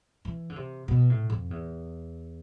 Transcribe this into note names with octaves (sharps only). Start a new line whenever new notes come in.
E3
D3
C3
B2
A2
F2
E2